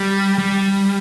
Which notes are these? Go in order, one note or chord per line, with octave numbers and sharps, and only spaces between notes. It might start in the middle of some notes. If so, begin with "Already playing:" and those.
Already playing: G3
G3